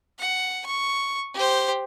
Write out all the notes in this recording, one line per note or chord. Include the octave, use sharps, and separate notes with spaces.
F#5
C#6
G4 C5